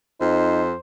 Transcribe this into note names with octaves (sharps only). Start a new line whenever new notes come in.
F2 D#4 C5